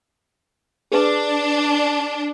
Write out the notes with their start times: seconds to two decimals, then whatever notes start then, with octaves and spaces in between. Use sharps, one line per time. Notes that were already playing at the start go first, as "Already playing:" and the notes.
0.92 D4 G#4 B4